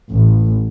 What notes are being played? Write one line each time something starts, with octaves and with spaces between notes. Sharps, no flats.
A1